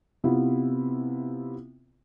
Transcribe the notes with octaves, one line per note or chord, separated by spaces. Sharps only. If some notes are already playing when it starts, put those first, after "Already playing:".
C3 B3 E4 F4